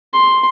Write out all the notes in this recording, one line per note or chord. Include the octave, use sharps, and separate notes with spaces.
C6